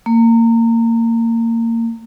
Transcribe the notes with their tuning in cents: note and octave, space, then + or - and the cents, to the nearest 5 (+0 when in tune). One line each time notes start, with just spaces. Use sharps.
A#3 -25